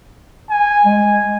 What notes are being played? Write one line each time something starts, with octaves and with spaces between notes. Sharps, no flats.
G#5
G#3